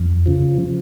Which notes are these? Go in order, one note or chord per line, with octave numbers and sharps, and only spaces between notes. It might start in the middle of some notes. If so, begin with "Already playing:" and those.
Already playing: F2
C#3 F3